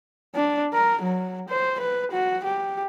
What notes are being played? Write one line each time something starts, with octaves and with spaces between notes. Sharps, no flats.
D4
A#4
F#3
C5
B4
F#4
G4